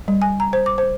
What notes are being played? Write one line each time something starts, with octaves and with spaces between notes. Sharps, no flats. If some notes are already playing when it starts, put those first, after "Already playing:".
G3
G#5
A#5
C5
D6
C5